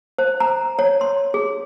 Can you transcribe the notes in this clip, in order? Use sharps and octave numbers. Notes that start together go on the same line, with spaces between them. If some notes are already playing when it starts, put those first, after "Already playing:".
C5
A#5
C#5
C6
G#4